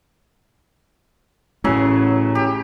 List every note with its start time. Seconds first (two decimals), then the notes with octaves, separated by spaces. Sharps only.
1.64 A1 A2 C#3 F#3 A3
2.35 G4